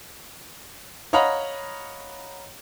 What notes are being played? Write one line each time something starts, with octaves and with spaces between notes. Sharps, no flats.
C#5 D#5 F5 F#5 A#5 B5